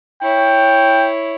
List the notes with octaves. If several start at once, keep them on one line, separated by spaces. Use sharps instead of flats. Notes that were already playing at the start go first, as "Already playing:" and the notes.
E4 C#5 G5